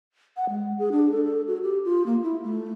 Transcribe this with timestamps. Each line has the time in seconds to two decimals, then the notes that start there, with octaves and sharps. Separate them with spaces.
0.37 F#5
0.50 G#3
0.79 G#4
0.92 D4
1.12 A4
1.25 A4
1.47 F#4
1.63 G4
1.85 F4
2.06 A#3
2.23 E4
2.44 A3